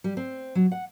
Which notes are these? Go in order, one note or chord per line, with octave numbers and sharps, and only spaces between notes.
G3
C4
F#3
F#5